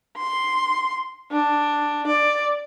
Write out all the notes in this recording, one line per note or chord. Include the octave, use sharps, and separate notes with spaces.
C6
D4
D5